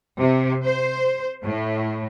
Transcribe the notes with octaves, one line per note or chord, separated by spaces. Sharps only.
C3
C5
A2